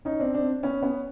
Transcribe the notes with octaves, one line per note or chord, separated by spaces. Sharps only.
C#4 D#4
C4 D4
C4 D4
B3 C#4
B3 C#4